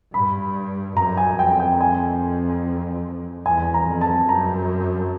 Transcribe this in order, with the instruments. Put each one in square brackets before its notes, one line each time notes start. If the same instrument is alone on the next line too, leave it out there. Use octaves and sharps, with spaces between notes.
[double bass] G2 [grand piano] B5
[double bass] F#2 [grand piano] A#5
[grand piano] G#5
[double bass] F2 [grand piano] G5
[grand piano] G5
G#5
[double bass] E2 [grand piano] G#5
[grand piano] A#5
[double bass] F2
[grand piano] A5
[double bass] F#2 [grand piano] A#5